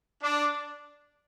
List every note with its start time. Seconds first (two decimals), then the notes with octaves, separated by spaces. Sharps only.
0.22 D4